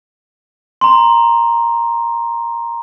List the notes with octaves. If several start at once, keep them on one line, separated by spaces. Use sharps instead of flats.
A#5 C6